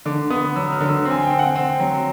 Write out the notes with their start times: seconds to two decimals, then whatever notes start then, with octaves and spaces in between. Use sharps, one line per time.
0.06 D3 D6
0.30 B3 D#6
0.56 F#3 E6
0.72 F6
0.80 D3
0.89 E6
1.05 C4
1.11 G#5
1.22 G5
1.30 C4
1.39 F#5
1.56 C4
1.80 F#3